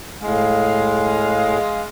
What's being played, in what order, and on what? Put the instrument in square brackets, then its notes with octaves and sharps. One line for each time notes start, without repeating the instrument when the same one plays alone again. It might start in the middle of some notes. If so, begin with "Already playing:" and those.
[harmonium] A2 [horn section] G#3 F5